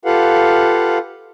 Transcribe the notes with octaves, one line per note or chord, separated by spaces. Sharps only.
F4 G4 A4 B4 F5 F#5